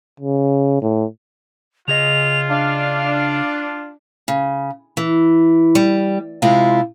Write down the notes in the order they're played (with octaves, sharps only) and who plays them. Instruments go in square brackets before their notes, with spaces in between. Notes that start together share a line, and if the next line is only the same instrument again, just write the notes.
[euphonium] C#3
A2
[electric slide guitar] C#3 G#4 D#5 [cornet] F4 [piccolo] F7
[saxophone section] D4 [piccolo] F5
[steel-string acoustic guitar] C#3
E3
G3
C3 G#3 E4 F4